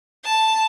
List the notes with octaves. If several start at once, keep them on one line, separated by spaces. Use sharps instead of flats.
A5